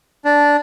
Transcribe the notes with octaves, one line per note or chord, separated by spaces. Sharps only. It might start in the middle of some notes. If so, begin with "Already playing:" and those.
D4